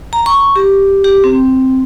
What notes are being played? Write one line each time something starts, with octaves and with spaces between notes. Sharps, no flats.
A#5
C#6
G4
G4
C4